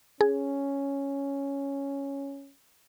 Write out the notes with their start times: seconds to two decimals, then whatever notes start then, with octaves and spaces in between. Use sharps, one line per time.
0.21 C#4 G#4